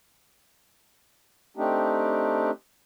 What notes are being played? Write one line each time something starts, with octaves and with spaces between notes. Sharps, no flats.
A3 C4 D4 D#4 G4